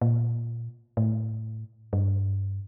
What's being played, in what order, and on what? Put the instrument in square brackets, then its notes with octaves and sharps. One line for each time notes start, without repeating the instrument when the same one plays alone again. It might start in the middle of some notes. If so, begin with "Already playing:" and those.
[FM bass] A#2
A2
G2